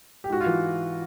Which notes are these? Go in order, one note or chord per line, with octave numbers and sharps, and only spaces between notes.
G4
G#2 F#4
F4
E3